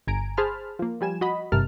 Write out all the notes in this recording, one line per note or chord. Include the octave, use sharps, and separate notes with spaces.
G1 G#5 A#5 D7
G#4 C5 A5 B5 F6
F3 A#3
F3 G3 G#5 E7
F#4 D#5 B5
G#1 G2 C3 A#4 A5 F6